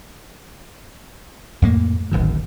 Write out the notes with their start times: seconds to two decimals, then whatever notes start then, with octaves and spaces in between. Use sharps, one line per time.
1.62 F2 A2 A#3
2.11 D1 G#1 F#2 D#3